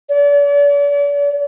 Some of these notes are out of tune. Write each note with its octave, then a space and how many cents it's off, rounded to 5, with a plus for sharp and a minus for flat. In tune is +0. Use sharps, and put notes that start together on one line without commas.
D5 -45